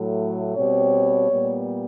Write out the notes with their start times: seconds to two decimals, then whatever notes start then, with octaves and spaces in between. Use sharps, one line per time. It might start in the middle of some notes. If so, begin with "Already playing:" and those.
Already playing: A2 F#3 A3
0.56 B2 G3 C4 C#5
1.30 A#2 G3 B3